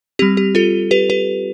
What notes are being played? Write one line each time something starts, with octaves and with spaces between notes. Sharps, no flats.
G3 C4 G4
G4
F4 A4
G4 B4
G4 B4